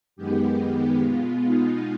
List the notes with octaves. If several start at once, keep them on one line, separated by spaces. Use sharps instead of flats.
F#2 D#3 G#3 B3 G4
B2 G#3 B3 F4
D#4